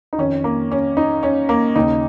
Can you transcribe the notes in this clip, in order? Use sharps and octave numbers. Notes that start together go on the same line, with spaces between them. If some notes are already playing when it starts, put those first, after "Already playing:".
D#4
F2 D#3 C#4
A#3
C#4
D#4
C#4
A#3
D#2 C#3 D#4